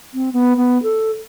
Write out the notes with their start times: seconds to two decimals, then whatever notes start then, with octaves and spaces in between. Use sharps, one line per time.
0.14 C4
0.33 B3
0.57 B3
0.83 A4